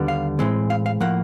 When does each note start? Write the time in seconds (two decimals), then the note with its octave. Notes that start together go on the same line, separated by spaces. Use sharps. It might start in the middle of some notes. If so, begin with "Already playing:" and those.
Already playing: D#2 D3 G3 B3
0.08 F5
0.39 A2 E3 G#3 C4
0.70 F5
0.86 F5
1.00 A2 F3 A#3 F#5